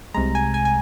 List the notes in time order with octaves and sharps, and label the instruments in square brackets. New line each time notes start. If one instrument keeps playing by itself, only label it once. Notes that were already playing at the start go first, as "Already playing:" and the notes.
[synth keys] C2 C3 G#3 A#5
G#5
G#5
G#5